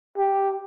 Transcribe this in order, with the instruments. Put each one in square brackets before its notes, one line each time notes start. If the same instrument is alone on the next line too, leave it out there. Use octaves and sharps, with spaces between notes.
[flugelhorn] G4